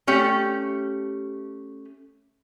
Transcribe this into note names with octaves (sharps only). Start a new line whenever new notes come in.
A3 C#4 G4